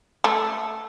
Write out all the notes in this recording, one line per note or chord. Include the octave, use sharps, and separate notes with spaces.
A3